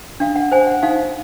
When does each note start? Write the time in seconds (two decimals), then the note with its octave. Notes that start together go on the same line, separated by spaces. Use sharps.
0.20 D4 F5
0.36 F#5
0.52 C5 G#5
0.67 F#5
0.83 D#4 F5